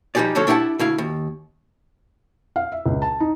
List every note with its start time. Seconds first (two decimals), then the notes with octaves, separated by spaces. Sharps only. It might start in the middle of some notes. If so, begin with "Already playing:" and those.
0.15 F3 G3 D#4 G4 G#4 D5
0.35 D2 F3 F#3 A4 C#5
0.47 D4 E4 G4 F5 F#5 A5
0.79 D2 E4 F5
0.98 D#2
2.56 F5
2.72 E5
2.86 C#2
3.02 A5
3.20 D#4